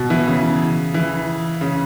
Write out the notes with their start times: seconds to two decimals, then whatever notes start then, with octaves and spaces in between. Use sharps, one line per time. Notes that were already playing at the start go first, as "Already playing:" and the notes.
Already playing: B2
0.10 E3
0.27 C#3
0.94 E3
1.61 C#3